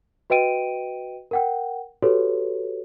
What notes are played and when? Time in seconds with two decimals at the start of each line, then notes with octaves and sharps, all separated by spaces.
0.30 F#4 B4 D#5 G5 D7 D#7
1.31 A#4 F#5 G5
2.02 F#4 G4 A4 B4 C#5